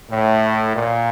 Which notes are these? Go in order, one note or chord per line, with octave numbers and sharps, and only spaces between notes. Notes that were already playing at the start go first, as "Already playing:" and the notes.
A2
A#2